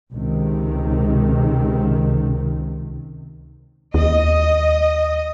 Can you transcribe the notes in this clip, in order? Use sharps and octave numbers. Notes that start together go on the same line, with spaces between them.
C#2 C3 D#3
D#2 D#5